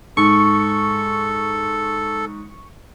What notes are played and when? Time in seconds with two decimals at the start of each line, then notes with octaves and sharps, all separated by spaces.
0.17 G#2 A4 C#6